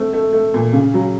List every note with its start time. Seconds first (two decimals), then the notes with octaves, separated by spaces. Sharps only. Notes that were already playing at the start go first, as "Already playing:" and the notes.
Already playing: A3 C4
0.13 A3
0.33 A3
0.54 A#2
0.73 C#3
0.94 F#3